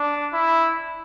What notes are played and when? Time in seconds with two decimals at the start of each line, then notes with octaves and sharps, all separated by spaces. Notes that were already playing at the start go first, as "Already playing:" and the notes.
Already playing: D4
0.33 E4